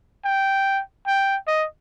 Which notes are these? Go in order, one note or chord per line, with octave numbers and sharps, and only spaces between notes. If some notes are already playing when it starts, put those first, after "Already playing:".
G5
G5
D#5